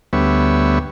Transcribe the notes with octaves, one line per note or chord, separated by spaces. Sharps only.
D2 G3 B3 C#5 E5